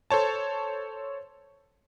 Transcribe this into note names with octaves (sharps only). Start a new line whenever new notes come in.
A4 C5 C#5 A5